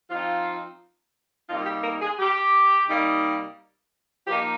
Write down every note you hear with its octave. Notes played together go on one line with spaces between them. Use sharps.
F3 C4 D#4 F4
C3 G3 A#3 D#4 F4
G4
A#4
G#4
G4
C3 G3 A#3 D#4
F3 A#3 D#4 G4